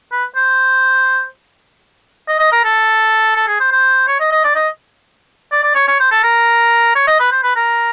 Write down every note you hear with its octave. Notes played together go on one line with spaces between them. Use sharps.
B4
C5
D#5
D#5
A#4
A4
A4
G#4
C5
C5
C#5
D#5
D#5
D5
D#5
D5
D5
C#5
C#5
C5
A4
A#4
C#5
D#5
B4
C5
B4
A#4